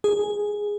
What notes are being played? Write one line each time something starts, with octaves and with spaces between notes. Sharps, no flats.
G#4